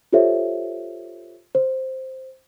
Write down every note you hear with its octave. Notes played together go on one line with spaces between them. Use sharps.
F4 G4 A4 C5 C#5 E5
C5